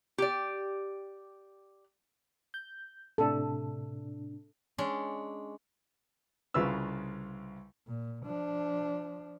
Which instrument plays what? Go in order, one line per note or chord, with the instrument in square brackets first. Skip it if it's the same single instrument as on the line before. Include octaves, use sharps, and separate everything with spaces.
[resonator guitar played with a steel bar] G4 D5
[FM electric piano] G6
[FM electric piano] A2 C3 D4 [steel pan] A4
[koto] G#3 C#4 D4
[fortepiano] C2 C#3 F4 B4 E6
[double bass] A#2
F3 D4